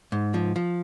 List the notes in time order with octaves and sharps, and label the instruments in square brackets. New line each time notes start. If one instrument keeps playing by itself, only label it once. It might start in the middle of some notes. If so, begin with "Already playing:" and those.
[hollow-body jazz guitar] G#2
F3
F3